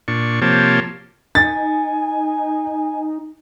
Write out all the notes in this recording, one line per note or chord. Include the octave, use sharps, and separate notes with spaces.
A#2 D4 C#6
C3 F3 A#3 G4 C#5 A5
D#4 G#5 A6